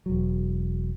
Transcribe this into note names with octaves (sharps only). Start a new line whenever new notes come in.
E1 F#3